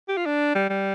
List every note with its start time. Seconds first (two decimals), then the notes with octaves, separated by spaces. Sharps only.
0.08 G4
0.17 F4
0.26 D4
0.55 G3
0.70 G3